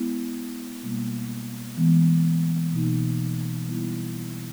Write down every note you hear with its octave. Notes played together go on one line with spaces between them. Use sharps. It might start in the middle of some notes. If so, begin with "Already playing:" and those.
Already playing: G#3 B3 E4
B2 G3 A#3
E3 G#3 B3
B2 A#3 D#4
G3 B3 E4